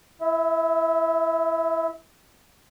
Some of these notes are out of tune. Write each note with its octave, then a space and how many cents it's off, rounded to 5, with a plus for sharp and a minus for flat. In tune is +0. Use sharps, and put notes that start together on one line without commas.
E4 +15 E5 -25